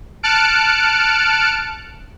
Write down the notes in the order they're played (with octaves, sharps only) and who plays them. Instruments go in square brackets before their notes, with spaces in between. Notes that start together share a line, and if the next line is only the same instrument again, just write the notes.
[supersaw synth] A5 F6 F#6 C#7 D7